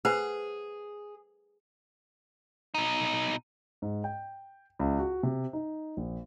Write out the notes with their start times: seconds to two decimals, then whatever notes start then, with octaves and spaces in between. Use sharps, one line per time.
0.05 G#4 B4 C5 F#5
2.74 B2 D#4
3.82 G#2
4.04 G5
4.79 C#2
4.99 F#4
5.23 C3
5.53 D#4
5.97 A#1